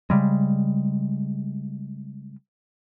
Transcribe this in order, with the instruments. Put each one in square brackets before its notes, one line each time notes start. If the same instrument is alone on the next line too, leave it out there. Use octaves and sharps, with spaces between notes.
[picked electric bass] C#3 G3 G#3